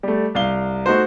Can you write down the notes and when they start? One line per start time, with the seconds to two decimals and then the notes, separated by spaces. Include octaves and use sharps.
0.03 G3 A3
0.35 C2 F5 G7
0.86 A3 D#4 F#4 C5